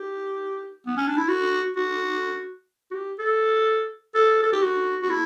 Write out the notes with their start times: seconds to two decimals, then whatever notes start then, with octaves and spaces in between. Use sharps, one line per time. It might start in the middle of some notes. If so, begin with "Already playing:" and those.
Already playing: G4
0.87 B3
0.97 C#4
1.08 D4
1.18 E4
1.28 F#4
1.76 F#4
2.91 F#4
2.95 G4
3.19 A4
4.15 A4
4.43 A4
4.53 G4
4.62 F#4
5.03 F#4
5.10 E4